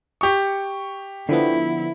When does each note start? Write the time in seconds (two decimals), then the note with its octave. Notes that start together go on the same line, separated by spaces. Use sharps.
0.21 G4 C#6
1.29 D3 F3 B3 E4